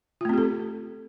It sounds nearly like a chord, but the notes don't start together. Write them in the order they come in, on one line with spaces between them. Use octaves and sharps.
F4 A3 C4 G4 A4